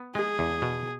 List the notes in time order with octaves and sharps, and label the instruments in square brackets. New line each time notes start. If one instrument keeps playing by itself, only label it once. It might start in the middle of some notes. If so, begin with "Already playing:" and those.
Already playing: [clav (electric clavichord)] B3
[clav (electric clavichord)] G#3 [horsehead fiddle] G#4
[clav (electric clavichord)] E2
B2